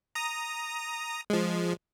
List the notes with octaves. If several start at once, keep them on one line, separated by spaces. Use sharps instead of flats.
A#5 D#6
F3 G#3